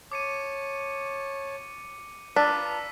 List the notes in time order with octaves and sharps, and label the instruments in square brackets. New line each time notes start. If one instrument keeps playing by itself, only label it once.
[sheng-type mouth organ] C#5 A5 [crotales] D6 C#7 D#7
[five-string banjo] D4 [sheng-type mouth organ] F4 B4 A#5 [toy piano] A5 [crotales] D6 E6 B6